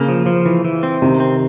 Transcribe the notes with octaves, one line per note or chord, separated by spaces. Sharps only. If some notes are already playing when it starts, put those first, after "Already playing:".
Already playing: C#3 A#3
F3
F3
E3
E3
C4
C3 D#3
C4